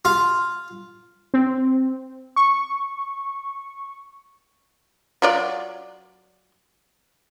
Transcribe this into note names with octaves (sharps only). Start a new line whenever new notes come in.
F4
C4
C#6
F#3 F4 D5